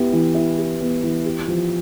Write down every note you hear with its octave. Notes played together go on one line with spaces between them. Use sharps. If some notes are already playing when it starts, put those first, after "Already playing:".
Already playing: B3 E4 G4
E3
E4
G4
B3
E3
G4
F3